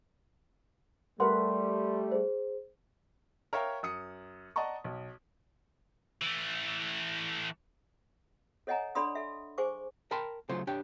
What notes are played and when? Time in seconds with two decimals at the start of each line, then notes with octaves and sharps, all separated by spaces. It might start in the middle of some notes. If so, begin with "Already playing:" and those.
1.20 G3 A3 A#4 B4 F#5 C6
2.12 G#4 C5
3.53 A#4 C#5 E5 F5 G5
3.83 F#2 D#6 C#7
4.56 D5 D#5 F#5 A5 A#5 C#6
4.84 B1
6.22 E3 A3
8.67 A4 C#5 D#5 F#5 G#5 A#5
8.95 D4 A4 D5 B5 C6 D#6
9.15 A4 E5
9.58 G#4 C5 G#5 C#6 D6
10.11 A#4 G5 A5 B5 C6
10.49 C#3 F#3 A3 F4 C5
10.67 D4 G4 C#5 G5